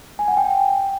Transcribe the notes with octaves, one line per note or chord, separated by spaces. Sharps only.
G#5
F#5
G5